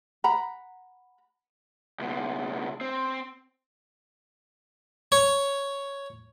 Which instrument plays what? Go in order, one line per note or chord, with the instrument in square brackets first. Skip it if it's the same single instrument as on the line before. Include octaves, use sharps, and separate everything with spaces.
[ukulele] F#5 A#5 B5
[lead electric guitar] C#2 B2
C4
[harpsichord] C#5